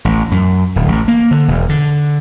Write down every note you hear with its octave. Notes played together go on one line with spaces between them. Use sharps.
A1
F#2
D1
A1
A#3
D3
E1
D3